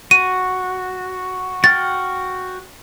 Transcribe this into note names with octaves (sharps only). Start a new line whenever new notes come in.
F#4 D#7
F#4 G5 F6 A6